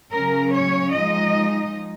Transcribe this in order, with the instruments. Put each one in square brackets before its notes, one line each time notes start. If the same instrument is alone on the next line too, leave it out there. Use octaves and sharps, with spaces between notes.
[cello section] C#3 F#3 C#4 A#4
C#5
F3 G#3 D#4 D#5